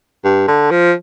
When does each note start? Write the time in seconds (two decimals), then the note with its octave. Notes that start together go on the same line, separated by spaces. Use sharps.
0.24 G2
0.48 D3
0.71 F3